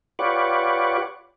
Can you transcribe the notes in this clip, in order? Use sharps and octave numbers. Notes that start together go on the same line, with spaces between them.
F4 G4 B4 C#5 D5 F#5